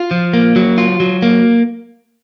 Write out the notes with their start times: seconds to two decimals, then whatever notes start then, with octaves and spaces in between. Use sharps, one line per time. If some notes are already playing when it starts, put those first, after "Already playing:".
Already playing: F4
0.11 F3
0.33 A#3
0.56 F#3
0.78 F4
1.00 F#3
1.22 A#3